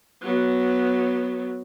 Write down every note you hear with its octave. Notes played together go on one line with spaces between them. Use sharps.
F#3 B3